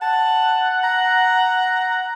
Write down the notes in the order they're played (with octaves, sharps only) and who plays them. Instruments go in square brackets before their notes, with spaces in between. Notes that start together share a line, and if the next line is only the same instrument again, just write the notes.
[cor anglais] F#5 [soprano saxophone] A5
[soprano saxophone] A#5